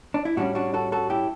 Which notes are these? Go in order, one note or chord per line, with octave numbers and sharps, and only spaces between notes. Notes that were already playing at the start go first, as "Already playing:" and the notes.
D4
E4
A2 G3 C#4 D4 F#4
D4 F#4
F#4 A4
F#4 A4
E4 G4